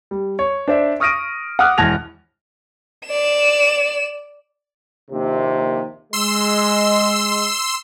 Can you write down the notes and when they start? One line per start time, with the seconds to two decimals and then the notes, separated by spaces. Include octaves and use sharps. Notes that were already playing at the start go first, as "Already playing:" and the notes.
0.11 G3
0.39 C#5
0.68 D4 C5 D5 E5
1.00 C#6 D#6 F6 A#6 D7 D#7
1.59 F#5 D6 D#6 F6 F#6
1.78 E1 E2 A5 G#6 A#6 F7
3.06 D5 E7
5.11 A#1 D#2 C3
6.13 G#3 C6 E6